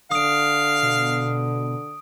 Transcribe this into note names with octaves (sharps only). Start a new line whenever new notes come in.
D3 F5 D#6 D7
B2